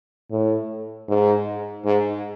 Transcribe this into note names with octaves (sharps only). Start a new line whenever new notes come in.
A2
G#2
G#2